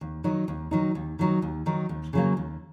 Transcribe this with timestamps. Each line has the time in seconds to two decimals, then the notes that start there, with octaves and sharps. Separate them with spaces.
0.01 D#2
0.24 D#3 F#3 D#4
0.48 D#2
0.71 D#3 F#3 D#4
0.95 D#2
1.19 D#3 F#3 D#4
1.42 D#2
1.66 D#3 F#3 D#4
1.89 D#2
2.13 C#3 F#3 A#3
2.37 D#2